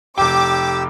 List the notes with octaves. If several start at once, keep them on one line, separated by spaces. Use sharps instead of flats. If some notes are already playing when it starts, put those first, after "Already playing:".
F1 G4 G5 D6 E6